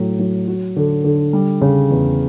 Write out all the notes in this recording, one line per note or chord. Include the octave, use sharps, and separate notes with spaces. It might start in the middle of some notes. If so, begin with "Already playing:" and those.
Already playing: A2 F#3
F#3
F#4
D3
D3
G3
C#3
E2